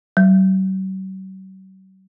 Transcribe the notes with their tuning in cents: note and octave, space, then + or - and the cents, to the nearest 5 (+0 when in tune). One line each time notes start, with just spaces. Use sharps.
F#3 +45